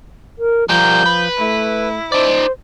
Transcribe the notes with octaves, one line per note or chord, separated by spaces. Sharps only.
A#4
F3 G3 A#4 G6
B4
A3 E4
D#4 C5 D5